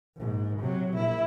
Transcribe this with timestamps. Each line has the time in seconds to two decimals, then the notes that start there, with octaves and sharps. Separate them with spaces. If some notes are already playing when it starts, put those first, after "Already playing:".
0.17 A#1 G#2
0.60 C3 F#3
0.94 A#1 E4